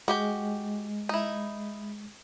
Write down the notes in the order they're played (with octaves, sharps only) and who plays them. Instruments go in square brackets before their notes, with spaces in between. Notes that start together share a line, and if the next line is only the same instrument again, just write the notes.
[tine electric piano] G#3 [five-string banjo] F#4 G4 G5
[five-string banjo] D#4 E4